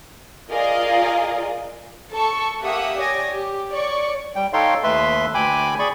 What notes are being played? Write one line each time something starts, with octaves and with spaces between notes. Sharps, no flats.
F4 G#4 A#4 D5 D#5 F5
A4 A5 C#6
A#3 G4 E5 F#5 D#6
G4 C#5 D5 G#5 D#6 A#6
G4
C#5 D5 C#6
G3 G5
D#4 A4 C#5 F5 G5 C6
D#2 A3 B4 E5 C6
D2 G5 G#5 B5 D6
G#4 D5 B5 C#6